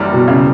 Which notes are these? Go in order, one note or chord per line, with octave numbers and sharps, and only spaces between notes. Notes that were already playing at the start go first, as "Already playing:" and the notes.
Already playing: F#1 F#2 E3 G3
B2
C#3